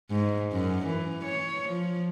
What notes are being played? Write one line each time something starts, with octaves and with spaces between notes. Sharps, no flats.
G#2
F#2
E3
C#5
F3